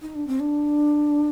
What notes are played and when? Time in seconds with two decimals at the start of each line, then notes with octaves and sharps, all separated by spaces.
0.02 D#4
0.15 D4
0.27 C4
0.40 D4